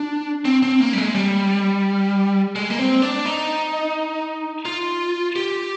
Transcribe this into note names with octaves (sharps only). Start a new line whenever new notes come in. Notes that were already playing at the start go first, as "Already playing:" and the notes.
Already playing: D4
C4
C4
A#3
G3
G#3
G3
G#3
A#3
C4
D4
D#4
F4
G4